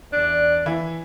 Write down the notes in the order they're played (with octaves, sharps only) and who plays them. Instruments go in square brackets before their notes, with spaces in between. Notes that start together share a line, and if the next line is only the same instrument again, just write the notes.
[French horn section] E2 D5 [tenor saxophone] D4
[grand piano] E3 E4